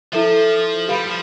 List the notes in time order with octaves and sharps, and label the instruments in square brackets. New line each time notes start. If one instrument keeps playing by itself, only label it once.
[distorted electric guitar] F3 [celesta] E4 A4 E5
[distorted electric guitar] G3 [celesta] G4 B4 F5 B5
[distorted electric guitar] F3